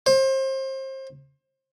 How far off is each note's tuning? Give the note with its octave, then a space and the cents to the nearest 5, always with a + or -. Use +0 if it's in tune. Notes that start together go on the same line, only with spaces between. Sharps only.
C5 +30